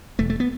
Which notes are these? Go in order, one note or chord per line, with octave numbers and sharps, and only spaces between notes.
E1 A3
A3
B3